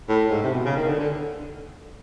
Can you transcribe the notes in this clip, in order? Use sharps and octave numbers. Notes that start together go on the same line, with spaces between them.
A2
G#2
C3
B2
C#3
D#3
D3
D3